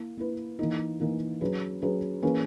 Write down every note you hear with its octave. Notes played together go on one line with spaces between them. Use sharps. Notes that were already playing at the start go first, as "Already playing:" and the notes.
Already playing: A#3 E4
A#3 E4 B4
E3 A#3 D#4
E3 A#3 D#4
F#3 C#4 G#4 B4
F#3 C#4 G#4 B4
E3 A#3 C#4 G#4 B4